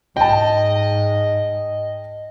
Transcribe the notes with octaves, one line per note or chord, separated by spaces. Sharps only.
G#2 D#5 G5 A5